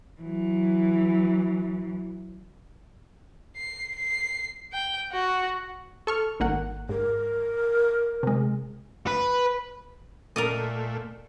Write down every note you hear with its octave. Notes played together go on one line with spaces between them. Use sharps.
E3 F#3
C7
C7
G5
F#4
A4 C#6 F6
G#1 A#3 F#5
G#2 A#4
C3 G#3
B4
A#2 A3 A#4 D5 D#5